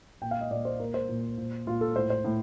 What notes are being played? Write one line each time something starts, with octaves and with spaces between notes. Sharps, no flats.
A#2 G5
F5
D#5
A#2 D5
C5
A#2 A#4
C5
A#2
A#2
A#2 F4
A4
A2 C5
C5
A2